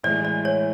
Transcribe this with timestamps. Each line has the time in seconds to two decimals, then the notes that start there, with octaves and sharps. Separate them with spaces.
0.04 A2 E3 G#3 D5
0.25 D5
0.45 C#5